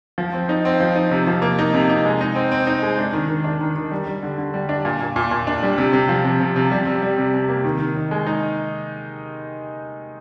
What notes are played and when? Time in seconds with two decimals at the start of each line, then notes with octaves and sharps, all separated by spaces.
0.18 F3
0.33 C4
0.49 D#4
0.65 C4
0.80 F3
0.96 D#4
1.11 C3
1.27 F3
1.42 A#3
1.58 D#4
1.74 C3
1.90 D#4
2.05 G#3
2.21 D#4
2.35 C4
2.51 C4
2.67 D#4
2.83 G#3
2.98 D4
3.13 D#3
3.29 D#3
3.44 D4
3.61 D#3
3.76 D#3
3.91 G3
4.07 G3
4.23 D3
4.38 D3
4.54 G3
4.69 D4
4.85 A#2
5.00 A#2
5.16 A#2
5.31 A#2
5.47 D4
5.63 G3
5.78 C3
5.93 C3
6.09 F3
6.24 C3
6.40 C3
6.56 C3
6.71 G3
6.87 C3
7.02 G3
7.18 C3
7.34 C3
7.48 A#3
7.64 D#3
7.80 D#3
7.96 D#4
8.11 G#3
8.26 D#4